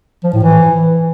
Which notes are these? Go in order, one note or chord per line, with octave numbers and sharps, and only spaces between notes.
F3
A2
E3